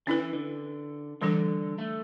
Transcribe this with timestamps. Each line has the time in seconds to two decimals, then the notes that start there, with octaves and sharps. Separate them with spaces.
0.07 D3 C#4 E4 B4
0.19 E3
0.33 D3
1.21 D3 E3 G3 D4 A4
1.78 A3